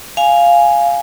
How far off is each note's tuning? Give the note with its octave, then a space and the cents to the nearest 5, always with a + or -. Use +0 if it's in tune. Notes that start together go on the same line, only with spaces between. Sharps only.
F5 +0 G#5 +0